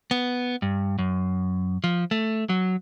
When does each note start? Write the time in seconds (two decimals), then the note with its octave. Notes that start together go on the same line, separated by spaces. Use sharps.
0.11 B3
0.62 G2
0.99 F#2
1.84 F3
2.11 A3
2.49 F#3